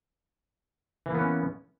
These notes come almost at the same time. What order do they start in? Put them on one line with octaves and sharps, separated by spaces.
E3 A#3 B3 C#4